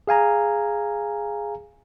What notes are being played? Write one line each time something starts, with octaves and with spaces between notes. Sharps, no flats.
G#4 F5 G#5 A#5